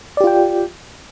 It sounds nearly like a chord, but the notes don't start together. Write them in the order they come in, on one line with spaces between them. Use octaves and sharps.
D5 G4 F4 G5